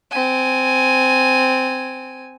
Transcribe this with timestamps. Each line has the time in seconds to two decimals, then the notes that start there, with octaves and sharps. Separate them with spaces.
0.11 C4 G#5